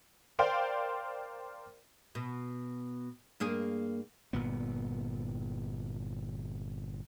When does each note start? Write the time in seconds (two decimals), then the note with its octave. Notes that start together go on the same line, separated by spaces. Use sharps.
0.39 A#4 C5 D5 F5 G5 C6
2.15 B2
3.40 G2 A#3 G#4
4.33 G1 A#2 B3